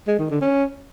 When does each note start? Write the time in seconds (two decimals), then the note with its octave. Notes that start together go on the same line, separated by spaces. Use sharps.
0.07 G#3
0.19 D#3
0.30 D3
0.41 C#4